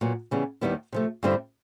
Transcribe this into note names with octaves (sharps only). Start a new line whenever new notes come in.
A#2 F#3 B3
C#3 E3 G3 B3
D#2 D#3 G3 B3 E4
C3 F3 A3
G2 D3 G3 C4 E4